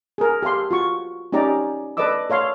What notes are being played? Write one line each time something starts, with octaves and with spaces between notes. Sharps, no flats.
G#4 A#4
G4 A4 F5 C6
F4 F#4 C#6
C#4 D#4 G4 D5 A#5
A4 B4 D5 D#5 D6 E6
A4 C#5 F5 C6